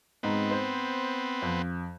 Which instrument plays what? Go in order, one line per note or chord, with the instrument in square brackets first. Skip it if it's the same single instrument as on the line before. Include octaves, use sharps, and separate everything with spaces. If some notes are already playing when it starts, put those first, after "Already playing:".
[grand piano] G#2 D#4 [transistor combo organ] B3 C4
[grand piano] C5
F2